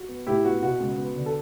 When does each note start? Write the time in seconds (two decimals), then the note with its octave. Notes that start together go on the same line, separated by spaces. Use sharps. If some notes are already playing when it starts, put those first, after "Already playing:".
Already playing: F#4
0.09 B3
0.27 A2 E4 G4
0.44 B3 F#4
0.62 B2 F#4
0.80 C#2
0.98 B3
1.16 D3
1.26 A4